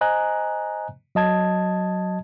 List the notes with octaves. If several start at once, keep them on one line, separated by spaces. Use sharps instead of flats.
C5 D#5 G#5 A#5 F#6
F#3 D#5 A5 G#6